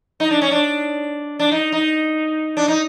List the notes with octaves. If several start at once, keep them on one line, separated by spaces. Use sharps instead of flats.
D#4
D4
C#4
D4
D4
D#4
D#4
D4
D#4